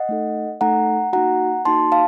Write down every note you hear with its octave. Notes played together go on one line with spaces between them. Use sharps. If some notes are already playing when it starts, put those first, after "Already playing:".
Already playing: D#5 F#5
A3 D#4 A4
A3 D#4 A4 F#5 A#5
A#3 D#4 F#4 F#5 A#5
A#3 D#4 F#4 A5 C6
F5 A5